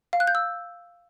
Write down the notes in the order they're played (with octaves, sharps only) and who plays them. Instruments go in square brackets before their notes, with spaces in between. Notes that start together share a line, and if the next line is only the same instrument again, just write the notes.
[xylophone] F5
F#6
G6
E6